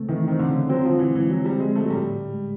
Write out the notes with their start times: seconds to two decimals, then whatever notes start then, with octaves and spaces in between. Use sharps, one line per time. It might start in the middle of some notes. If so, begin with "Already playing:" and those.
Already playing: C#3 A3 C4
0.08 D#3 E3
0.28 D#3 C4
0.39 D3
0.49 C#3
0.69 F#3 C4
0.85 D3 F3
0.99 E3
1.10 G#3
1.15 E3
1.29 F3 F#3
1.45 G3 C4
1.60 G#3
1.70 D3
1.76 A3
1.85 F#3
1.90 A2 G3
2.10 A2
2.30 G#3